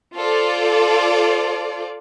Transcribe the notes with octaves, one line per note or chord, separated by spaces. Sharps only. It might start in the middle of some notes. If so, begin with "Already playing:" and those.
F4 A4 C5 D5